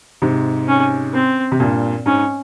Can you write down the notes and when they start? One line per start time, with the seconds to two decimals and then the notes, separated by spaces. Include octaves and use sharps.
0.22 G#2 C3
0.68 C#4
1.14 C4
1.52 C3
1.60 G2 A#2
2.06 G#2 C#4